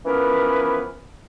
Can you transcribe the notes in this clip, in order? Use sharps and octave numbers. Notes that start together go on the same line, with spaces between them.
E3 F3 B3 C#4 A#4 B4